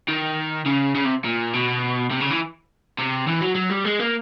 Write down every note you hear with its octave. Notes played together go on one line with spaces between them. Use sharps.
D#3
C#3
C#3
C3
A#2
B2
C3
C#3
E3
C3
E3
F#3
F#3
G3
G#3
A#3